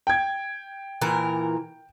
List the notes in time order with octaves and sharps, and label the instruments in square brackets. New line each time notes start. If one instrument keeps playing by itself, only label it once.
[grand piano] G5 G#6
[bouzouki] A#2 E3 A#4